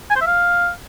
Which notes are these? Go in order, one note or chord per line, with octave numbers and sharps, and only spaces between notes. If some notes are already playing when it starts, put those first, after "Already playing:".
G#5
C5
E5
F5